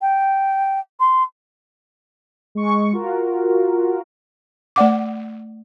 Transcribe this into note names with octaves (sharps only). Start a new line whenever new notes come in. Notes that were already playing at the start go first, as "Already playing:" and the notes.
G5
C6
G#3 C#6
F4 F#4 A#4
A3 D5 F#5 D6